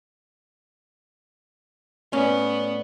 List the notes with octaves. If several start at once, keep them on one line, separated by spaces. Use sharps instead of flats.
A2 B3 C#4 D5